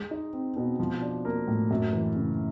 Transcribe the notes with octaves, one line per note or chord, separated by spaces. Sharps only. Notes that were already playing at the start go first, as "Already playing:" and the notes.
Already playing: G#3
D#4
C4
B2
F3
D4
A#3
A2
F#2
E3
C#3